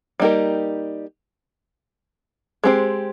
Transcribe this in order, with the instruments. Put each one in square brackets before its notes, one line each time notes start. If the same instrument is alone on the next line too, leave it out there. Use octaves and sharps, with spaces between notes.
[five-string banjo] G3 A#3 D#4 G4 A#4
G#3 C4 G4 C5